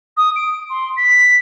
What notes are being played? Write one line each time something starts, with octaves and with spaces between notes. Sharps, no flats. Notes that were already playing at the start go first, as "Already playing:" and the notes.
D#6
D7
C6
B6